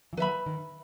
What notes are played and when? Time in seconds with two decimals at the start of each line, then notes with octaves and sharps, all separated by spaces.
0.13 E3
0.17 D#3 F#3 B4 E5 B5
0.46 D#3